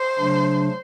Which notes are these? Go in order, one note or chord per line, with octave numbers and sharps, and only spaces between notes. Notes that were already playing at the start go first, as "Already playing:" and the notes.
Already playing: C5
C#3 F#3 A3 D4